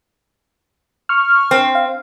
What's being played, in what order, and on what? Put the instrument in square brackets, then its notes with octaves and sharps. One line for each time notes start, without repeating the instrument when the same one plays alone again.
[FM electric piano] C#6 F6
[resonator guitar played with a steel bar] C4
[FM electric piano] F5